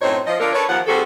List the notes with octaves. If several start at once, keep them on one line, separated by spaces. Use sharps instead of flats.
F#2 A2 C4 D#4 C5 C#5
F3 D#5
D3 F3 D4 A4 A#4
D4 A4 B4 C#5
D#2 F3 F#5
D#2 G3 C4 F#4 G#4 A4